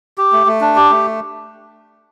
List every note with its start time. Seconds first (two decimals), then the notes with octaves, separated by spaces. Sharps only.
0.18 G4
0.33 A3
0.47 A3
0.61 D4
0.76 G4
0.90 A3